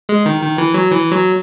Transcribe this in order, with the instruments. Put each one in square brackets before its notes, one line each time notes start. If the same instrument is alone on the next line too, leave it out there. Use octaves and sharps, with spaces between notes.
[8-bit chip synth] G#3
D#3
D#3
E3
F#3
E3
F#3